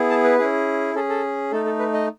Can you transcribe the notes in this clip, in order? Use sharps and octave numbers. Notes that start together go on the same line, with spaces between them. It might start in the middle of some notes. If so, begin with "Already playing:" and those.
Already playing: B3 E4 G#4
A5
B4
C#4 E4 G#4
C#4 G#4 A4
A4
A3 D#4 A4
A4
B4
D#5